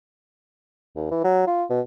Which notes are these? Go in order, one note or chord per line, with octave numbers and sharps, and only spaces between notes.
D#2
E3
F#3
F4
B2